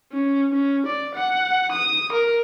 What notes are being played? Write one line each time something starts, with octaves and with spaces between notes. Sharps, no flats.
C#4
C#4
D5
F#5
D#6
A#4